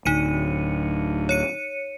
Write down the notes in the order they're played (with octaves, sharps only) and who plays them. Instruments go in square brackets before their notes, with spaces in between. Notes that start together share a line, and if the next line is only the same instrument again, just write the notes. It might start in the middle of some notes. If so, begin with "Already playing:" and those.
[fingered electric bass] D1 D2 [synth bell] D#4 C#7 D#7
[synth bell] C#5 C#7 D#7